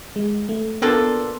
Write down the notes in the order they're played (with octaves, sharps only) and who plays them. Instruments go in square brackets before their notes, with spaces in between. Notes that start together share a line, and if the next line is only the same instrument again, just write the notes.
[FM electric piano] G#3
A3
[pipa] A#3 D4 F4 A4 [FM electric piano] B3